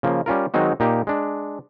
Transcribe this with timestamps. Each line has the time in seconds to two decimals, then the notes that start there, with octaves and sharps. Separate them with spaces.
0.03 C#3 F3 A#3
0.26 G3 C#4 F4 A#4
0.54 D#3 F#3 G#3 C4 D#4 F#4
0.80 A#2 A#3 D#4 G4
1.07 G#3 D4